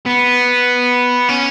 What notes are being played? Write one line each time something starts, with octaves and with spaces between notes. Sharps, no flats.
B3
C#4